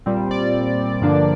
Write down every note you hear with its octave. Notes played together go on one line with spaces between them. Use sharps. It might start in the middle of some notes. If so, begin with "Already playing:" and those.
A#2 G3 C4
D5
G2 D3 F3 A#3 D4